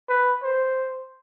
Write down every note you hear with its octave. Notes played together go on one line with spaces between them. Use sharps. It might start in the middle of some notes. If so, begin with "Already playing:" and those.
B4
C5